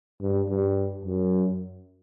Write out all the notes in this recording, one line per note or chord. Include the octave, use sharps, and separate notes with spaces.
G2
G2
F#2